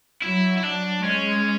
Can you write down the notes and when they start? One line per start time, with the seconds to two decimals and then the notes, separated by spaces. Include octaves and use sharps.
0.22 F#3 E4
0.58 E4
0.64 D4
1.03 G#3 C#4